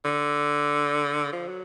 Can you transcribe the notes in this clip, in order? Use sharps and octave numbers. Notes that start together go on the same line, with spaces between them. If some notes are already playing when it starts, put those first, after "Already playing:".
D3
F3
F#3